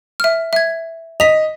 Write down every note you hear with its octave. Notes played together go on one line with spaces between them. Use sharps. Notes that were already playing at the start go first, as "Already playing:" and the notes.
E5 F6
E5 G#6
D#5 B6 F7